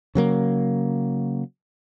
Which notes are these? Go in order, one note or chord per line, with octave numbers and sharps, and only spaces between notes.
C#3 F#3 A#3